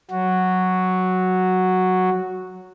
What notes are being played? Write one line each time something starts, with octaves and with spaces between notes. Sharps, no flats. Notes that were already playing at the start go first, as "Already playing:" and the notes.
F#3 F#4